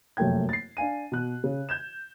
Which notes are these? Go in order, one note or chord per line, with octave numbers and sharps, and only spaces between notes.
F1 F#2 A3 A#3 G5 G#6
A6 C7
D4 F5 G#5 D#7
B2 F#6
C#3
G6 G#6 E7